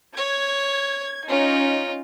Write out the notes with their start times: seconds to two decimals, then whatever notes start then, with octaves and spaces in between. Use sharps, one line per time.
0.17 C#5 G#6
1.29 C#4 D#4 F4